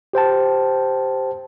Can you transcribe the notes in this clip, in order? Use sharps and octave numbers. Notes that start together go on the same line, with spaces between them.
G4 C5 G5 A5